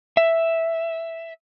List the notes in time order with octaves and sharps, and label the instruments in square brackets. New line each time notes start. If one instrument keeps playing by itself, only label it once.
[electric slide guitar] E5